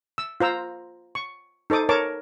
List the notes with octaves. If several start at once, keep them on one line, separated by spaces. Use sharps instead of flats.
E6
F4 C5 A#5 E6
C#6
D#4 A4 C5 D6 D#6
A#4 C#5 A5 D6